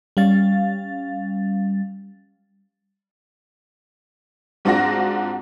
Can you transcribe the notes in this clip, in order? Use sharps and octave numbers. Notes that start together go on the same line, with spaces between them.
G3 C#4 F5 A6
G#2 C4 D4 F4 F#4 A#6